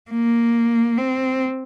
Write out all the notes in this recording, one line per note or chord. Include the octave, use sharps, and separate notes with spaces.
A#3
C4